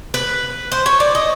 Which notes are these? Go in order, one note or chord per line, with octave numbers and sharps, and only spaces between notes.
B4
C5
C#5
D5
D#5